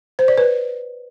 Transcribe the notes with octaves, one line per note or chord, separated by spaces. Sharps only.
C5
D5
B4